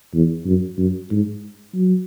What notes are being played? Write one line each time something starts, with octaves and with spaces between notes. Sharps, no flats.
E2
F#2
F#2
G#2
F#3